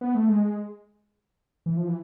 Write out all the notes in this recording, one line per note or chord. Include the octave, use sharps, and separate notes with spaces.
B3
A3
G#3
E3
F3
E3